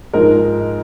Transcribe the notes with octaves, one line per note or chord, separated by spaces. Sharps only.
G#2 F3 G#3 A#4